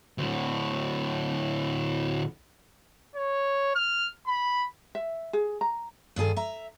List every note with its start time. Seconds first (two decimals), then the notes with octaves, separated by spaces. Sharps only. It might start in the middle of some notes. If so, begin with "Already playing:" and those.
0.18 D2 A2
3.16 C#5
3.76 F6
4.27 B5
4.95 E5
5.33 G#4
5.61 A#5
6.16 G2 D#3 G#4 A4
6.36 E5 A#5